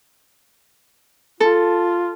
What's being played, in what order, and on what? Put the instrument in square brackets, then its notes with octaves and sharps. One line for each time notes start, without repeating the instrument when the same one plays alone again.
[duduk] F4 [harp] A4